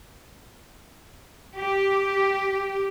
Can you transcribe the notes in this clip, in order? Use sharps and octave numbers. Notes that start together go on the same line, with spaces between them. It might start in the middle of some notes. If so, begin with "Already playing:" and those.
G4